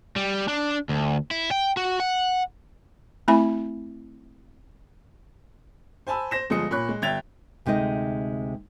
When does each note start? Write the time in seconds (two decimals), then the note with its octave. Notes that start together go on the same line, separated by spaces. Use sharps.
0.16 G3
0.48 D4
0.89 D2
1.31 E4
1.51 G5
1.77 F#4
2.00 F#5
3.28 A3 C4 E4 E5 G#5 B5
6.07 C5 G#5 A5 B5 E6
6.31 C5 A#6 E7
6.50 G1 F3 G#3 G#4 D#6 C#7
6.71 A#2 C#5 B5 C#6 F#6
6.89 G#3
7.02 G1 E5 G5 G#6 A6 F7
7.66 D2 C3 G#3 D#4 D#5